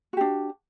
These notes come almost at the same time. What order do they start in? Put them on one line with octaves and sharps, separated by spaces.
F#4 G4 D4